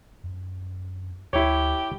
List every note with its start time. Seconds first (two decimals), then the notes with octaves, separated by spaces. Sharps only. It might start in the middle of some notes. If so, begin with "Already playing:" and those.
0.24 F#2
1.33 D2 E4 G4 C#5